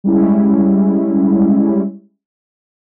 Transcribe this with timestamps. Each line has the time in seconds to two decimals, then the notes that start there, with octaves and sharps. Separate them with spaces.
0.04 G3 G#3 C#4 E4